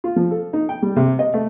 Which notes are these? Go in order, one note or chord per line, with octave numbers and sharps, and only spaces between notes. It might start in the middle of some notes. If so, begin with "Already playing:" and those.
F4
F3
A4
D#4
G5
G3
C3
D#5
A3